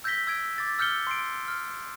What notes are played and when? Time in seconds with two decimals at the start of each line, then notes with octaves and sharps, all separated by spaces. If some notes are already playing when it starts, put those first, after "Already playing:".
0.04 E6 G6 G#6 A#6 B6 G7
0.27 E6 G#6 D7
0.58 D6 A6
0.79 E6 F6 G6 C#7 G7
1.07 C6 C7 D7
1.48 F6